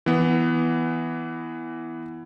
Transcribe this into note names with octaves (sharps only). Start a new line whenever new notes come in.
E3 B3